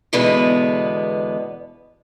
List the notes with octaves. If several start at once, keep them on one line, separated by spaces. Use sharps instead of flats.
E2 B2 D3 G#3 B3 B4